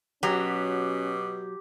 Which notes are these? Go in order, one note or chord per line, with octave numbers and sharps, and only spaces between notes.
B2 F#3 C#4 G4